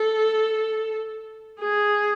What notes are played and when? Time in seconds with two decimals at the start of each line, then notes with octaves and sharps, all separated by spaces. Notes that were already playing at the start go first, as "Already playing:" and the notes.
Already playing: A4
1.59 G#4